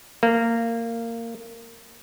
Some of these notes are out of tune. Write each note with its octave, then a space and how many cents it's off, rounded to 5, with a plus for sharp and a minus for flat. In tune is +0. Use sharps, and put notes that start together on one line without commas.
A#3 -20